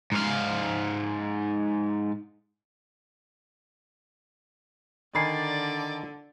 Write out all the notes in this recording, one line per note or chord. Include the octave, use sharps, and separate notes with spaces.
G#2 F5
D3 D#3 D5 G#5 B5 C7